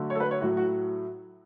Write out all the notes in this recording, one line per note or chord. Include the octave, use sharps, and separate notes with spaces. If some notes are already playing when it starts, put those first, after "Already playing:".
Already playing: D3 F#3 A3
C#5
A4
B4
C#5
A2 F#3 A3 F#4
F#4